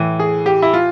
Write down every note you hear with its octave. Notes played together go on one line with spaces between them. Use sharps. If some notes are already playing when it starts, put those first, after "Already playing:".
Already playing: A2 E3
G#4
G4
E4
F4